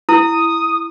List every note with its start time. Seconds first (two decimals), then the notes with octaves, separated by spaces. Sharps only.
0.09 E4 D#6